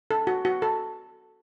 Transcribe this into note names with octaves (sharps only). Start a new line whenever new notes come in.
A4
F#4
F#4
A4